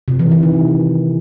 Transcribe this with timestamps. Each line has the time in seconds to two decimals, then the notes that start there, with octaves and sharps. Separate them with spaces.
0.08 C3
0.19 E3
0.31 E3
0.43 D#3